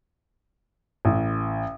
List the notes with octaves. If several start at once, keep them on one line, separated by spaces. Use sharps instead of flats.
A1